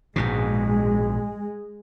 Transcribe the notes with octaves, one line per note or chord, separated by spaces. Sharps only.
A#1 G#2 B2 G#3